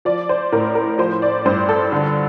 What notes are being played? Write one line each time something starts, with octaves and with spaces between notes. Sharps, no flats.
F3 D5
C5
A2 A#4
A#4
F3 C5
D5
G2 C5
A4
D3